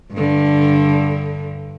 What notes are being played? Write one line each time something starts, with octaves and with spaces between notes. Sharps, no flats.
G2 D3